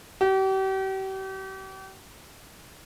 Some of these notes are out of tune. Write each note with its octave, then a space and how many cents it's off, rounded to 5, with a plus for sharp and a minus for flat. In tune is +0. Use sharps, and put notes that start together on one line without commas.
G4 -40